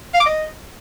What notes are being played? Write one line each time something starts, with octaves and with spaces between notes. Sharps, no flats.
F5
D6
D#5